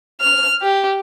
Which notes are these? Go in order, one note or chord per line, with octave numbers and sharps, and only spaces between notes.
F6
G4